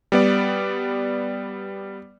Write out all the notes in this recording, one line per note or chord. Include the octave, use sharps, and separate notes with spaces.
G3 B3 D5